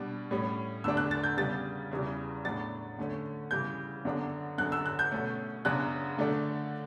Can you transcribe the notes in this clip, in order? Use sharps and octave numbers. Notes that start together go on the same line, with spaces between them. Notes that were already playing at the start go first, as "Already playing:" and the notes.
Already playing: B2 G3 D4
A2 G3 C#4
E2 D3 A3 D4 E6
F#6
A6
G6
C#3 G3 B3 A6
E2 C#3 E3 G3
A2 F#3 B3 D4 A6
D3 A3 C#4
C#3 E3 G3 G6
F#2 D3 F#3 B3 D4
F#2 D3 F#3 F#6
E6
F#6
G6
B2 A3 C#4
F#2 C#3 F#3 B3 D4 F#6
D3 A3 D4